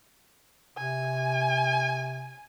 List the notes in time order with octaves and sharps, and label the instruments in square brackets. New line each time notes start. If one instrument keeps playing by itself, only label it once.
[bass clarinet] C3 [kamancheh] G#5